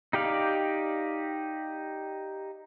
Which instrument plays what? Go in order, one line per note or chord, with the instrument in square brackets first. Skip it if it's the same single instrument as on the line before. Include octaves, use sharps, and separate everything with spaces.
[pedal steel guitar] D#4 G4 D5 F5